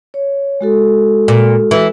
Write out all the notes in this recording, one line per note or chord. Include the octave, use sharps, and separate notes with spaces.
C#5
G#3 F#4 A4
A#2
E3